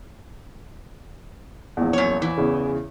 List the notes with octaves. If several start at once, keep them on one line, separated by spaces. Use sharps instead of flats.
A#1 E2
F#2 C#5
E3
E2 C#3